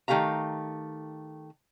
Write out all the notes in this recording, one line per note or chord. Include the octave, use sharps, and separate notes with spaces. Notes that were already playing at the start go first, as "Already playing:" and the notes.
D#3 A3 G4 F5 A#5